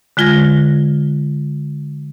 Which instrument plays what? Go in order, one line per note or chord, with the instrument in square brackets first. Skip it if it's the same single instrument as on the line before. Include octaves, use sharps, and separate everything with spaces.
[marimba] D3 G#3 F4 G#6 A#6